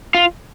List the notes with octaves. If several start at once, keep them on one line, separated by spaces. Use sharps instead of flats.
F4